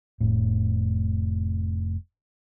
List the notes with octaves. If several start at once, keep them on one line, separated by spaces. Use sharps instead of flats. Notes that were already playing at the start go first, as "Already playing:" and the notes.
F1 A2